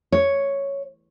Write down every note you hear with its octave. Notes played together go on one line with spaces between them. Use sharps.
C#5